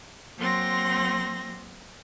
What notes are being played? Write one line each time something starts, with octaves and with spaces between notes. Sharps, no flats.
F#3 A#3 C4 C6 A#6